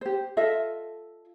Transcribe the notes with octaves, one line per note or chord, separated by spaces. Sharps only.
G4 C5
F4 A4 D#5 E5